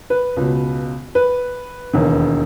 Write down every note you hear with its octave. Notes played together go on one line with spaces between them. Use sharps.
B4
C#2 B2
B4
E1 D#2 D#3